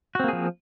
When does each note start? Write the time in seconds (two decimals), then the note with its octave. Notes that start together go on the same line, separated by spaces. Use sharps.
0.15 F#4
0.20 C4
0.24 A#3
0.28 G#4
0.33 F3